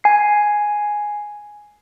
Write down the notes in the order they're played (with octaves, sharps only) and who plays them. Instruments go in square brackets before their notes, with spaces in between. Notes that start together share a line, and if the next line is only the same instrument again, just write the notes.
[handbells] G#5 C7